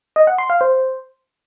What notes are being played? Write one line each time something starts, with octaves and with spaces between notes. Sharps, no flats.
D#5
F#5
C6
F5
C5